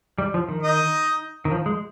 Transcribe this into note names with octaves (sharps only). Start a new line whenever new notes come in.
G3
F3
D#3
D#4 D#5
D#3
F3
G#3